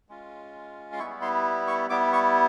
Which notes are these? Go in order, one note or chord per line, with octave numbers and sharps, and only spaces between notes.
G#3 C#4 F4
C6
G3 B3 E4 C#6
C6
C#6
G3 B3 E4 D6
C#6